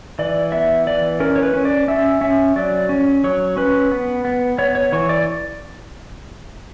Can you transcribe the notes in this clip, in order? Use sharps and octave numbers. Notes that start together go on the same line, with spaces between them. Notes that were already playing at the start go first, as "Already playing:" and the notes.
E3 D5
B3 E5
E3 D5
C#4 A#4
C#5
B4
C#4
D5
C#4 E5
C#4 E5
F#3 D5
C#4
F#3 C#5
C#4 B4
B3
B3
B3 C#5
C#5
E3 C#5
D5